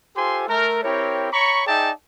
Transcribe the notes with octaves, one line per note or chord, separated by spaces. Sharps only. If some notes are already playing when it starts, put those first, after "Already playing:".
F4 G4 A4 C5 G#5 C6
A3 A#4
C4 E4 G4 A#4 C#5
C#5 A#5 B5 C#6
D#4 G#4 D5 E5 G5 A5